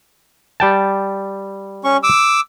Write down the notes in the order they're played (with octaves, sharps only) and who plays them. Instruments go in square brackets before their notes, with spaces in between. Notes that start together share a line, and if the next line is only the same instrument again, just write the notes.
[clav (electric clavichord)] G3 G5 A5
[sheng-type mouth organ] C#4 C#6
D6 E6